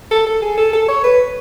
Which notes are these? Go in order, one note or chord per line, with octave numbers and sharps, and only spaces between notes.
A4
A4
G#4
A4
A4
C#5
B4